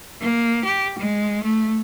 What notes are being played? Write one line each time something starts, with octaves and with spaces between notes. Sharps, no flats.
A#3
G4
G#3
A3